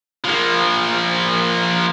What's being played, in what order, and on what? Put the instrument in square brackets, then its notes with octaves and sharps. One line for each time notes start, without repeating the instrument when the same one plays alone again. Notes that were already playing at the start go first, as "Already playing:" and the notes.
[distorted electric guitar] F3 A#3